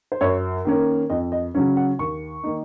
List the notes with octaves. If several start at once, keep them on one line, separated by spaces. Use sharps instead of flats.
C5
F#2 C#5
D#3 A#3 C#4
F2 D#5
D#5
C#3 F#3 C#4
F#5
D#2 C#6
D#3 A#3 D#4